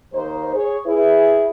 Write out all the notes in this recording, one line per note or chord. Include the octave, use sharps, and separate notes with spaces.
D#2 D#4 C5
G#4 C#5
E4 G#4 B4